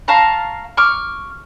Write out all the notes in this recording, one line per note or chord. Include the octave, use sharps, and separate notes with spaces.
F5 A5 A#5 C#6
C#6 D6 F6